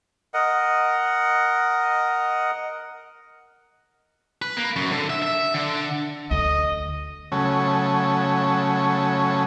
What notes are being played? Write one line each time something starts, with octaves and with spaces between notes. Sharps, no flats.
A#4 D#5 F#5
B4
A#3
F#2
D3
E5
E5
D3
D2 D#5
C#3 F#3 A3 C#4